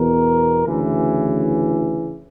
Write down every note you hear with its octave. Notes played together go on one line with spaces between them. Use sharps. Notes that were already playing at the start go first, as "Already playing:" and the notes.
Already playing: E2 B2 A#4
D2 C#3 E3